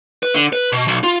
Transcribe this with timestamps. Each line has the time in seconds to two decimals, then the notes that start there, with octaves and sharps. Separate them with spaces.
0.23 B4
0.34 D3
0.53 B4
0.72 B2
0.88 B1
1.03 F4